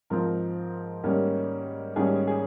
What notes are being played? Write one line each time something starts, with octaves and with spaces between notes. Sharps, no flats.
G#2 F3 C4 A#4
G#2 D#3 G3 A#3 C#4
G#2 D#3 G3 A#3 C#4 G#4
G#4